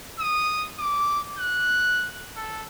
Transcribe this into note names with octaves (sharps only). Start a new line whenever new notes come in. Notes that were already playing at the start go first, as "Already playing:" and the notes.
D#6
D6
F#6
A4